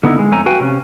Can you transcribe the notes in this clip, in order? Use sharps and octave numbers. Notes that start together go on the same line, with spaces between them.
D3 B3 D#4 E4
G#3
F2 A3 C#5 G#5 A#5
F#4 B4 F5 G5 G#5
C3 C#4